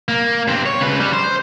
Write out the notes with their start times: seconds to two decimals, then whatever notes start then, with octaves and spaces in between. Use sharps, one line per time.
0.08 A#3
0.48 G2 C4
0.66 C#5
0.81 C#3 B4
1.00 G3
1.13 C5